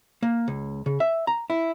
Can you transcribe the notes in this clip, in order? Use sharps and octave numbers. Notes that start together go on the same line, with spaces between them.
A#3
C#2
C#3
E5
A#5
E4